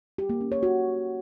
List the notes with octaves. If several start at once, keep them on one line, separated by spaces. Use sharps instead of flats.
G4
A#3
C#4
C#5
F#4